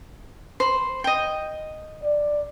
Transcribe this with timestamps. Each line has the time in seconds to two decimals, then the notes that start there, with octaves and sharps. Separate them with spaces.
0.60 C5 B5
1.04 D#5 G5
2.04 D5